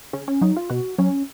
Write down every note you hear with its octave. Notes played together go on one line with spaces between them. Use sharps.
C#3 C#4
C#4
F#3 D#4
F4
B2 F#4
F#3 C#4